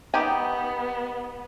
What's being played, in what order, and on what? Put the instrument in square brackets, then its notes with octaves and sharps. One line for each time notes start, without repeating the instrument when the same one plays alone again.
[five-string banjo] D#3 G4 G#5 [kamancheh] B3